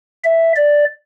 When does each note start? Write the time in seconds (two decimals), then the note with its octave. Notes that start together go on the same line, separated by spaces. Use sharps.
0.24 E5
0.56 D5